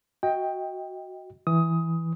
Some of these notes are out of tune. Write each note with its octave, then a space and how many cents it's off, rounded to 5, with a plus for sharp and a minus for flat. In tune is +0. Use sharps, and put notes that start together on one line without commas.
F#4 +0 D#5 +25 G5 +10
E3 +0 D#6 +15